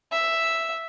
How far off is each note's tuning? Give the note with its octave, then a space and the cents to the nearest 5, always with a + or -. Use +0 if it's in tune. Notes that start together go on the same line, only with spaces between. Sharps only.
E5 +0